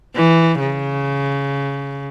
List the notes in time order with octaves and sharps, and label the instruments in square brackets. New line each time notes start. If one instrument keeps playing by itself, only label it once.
[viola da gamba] E3
C#3